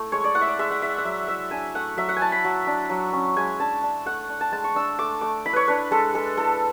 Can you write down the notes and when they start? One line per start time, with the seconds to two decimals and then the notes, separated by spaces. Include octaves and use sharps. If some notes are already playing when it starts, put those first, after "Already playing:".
Already playing: A3 E4
0.12 G#3 C#5
0.24 D5
0.35 E4 F#5
0.41 E5
0.47 D5
0.59 G#3 E5
0.71 F#5
0.81 E4 E5
0.98 F#5
1.04 F#3 E5
1.28 E4 E5
1.51 D4 G#5
1.75 A3 F#5
1.97 F#3 E5
2.09 F#5
2.17 E4 G#5 A5
2.32 B5
2.44 F#3
2.67 D4
2.90 F#3
3.13 C#4
3.37 G#3 G#5
3.60 D4 A5
3.83 D4
4.06 A3 F#5
4.29 D4
4.41 A5
4.52 G#3 A5
4.64 C#6
4.75 D4 E6
4.99 A3 D6
5.21 A3 D6
5.46 E4 B5
5.53 B4 C#5
5.68 D4 B4
5.91 G#3 A4
6.14 G#3 A4
6.37 E4 A4